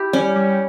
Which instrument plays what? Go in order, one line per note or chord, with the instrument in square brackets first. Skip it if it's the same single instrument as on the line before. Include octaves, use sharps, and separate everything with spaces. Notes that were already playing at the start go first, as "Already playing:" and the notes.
Already playing: [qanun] E4 G4
[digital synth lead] G3 [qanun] C#4
[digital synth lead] G3